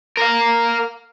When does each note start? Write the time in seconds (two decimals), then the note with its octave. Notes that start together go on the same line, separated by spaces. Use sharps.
0.17 A#4 F5